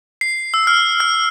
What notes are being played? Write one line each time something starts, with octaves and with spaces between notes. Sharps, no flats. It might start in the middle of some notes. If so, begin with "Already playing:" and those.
C7
E6
F6
F6